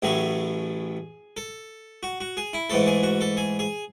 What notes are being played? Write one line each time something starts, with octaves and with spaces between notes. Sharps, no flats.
A1 A2 F#3 A3 G#4
A4
F#4
F#4
G#4
E4
G#2 E3 A3 A4
G#4
F#4
A4
G#4
G#4